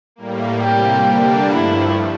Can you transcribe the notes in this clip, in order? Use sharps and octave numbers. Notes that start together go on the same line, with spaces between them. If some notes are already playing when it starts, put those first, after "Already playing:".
A2 G3 A#3
C3 G3 A#3 G4
D3 G3 A#3 D4
G2 F3 A3 E4